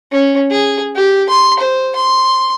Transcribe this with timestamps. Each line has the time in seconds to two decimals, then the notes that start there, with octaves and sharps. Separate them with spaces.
0.12 C#4
0.51 G#4
0.96 G4
1.29 C6
1.60 C5
1.96 C6